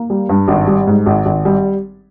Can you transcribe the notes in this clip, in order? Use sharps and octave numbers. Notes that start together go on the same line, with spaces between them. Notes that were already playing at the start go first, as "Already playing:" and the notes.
Already playing: A#3
G3
G2
G#1
G3
G#2
G#1
G#1
G3